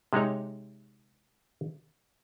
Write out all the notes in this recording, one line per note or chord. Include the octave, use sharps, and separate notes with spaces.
C3 G#3 D#4 C#5